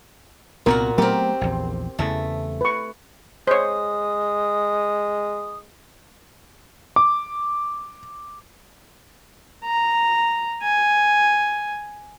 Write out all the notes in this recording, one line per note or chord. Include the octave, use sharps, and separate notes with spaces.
C2 A#2 B3 C4 F#4 A#4 F#5
F#3 A3 B3 C4 G4 A#4
A#1 E2
E2 C#3 E3 A3
B4 C#6
G#3 C5 C#5 D#6
D6
A#5
G#5